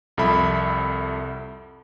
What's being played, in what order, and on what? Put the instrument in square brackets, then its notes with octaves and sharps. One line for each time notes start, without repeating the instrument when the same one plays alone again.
[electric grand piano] C2 F2 A4 E5 B5